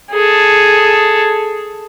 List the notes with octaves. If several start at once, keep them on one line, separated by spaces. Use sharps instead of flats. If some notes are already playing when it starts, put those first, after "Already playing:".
G#4 A4